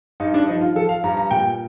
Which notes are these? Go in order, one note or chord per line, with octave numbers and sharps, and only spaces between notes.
G2 D#4
D4
F3 D#4
F4
F3 A4
F5
G2 A#5
A#5
A#2 G5